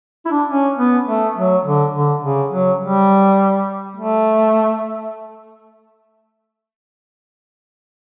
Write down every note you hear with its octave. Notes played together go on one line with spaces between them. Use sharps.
E4
D4
C#4
B3
A3
F#3
D3
D3
C#3
F#3
G3
A3